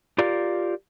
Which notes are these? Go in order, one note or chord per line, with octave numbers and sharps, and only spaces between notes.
F4 G4 A#4 D5 F5